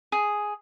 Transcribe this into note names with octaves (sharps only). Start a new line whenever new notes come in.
G#4